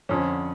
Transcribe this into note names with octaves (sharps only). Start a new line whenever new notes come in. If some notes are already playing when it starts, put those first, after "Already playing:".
F2 D3 F3 C#4